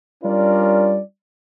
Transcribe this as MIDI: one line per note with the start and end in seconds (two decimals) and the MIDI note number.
0.23 0.99 55
0.23 0.99 61
0.23 0.99 62
0.23 0.99 65
0.23 0.99 70
0.23 0.99 74